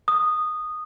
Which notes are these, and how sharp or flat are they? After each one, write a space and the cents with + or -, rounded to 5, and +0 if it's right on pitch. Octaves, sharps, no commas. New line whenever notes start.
D#6 -10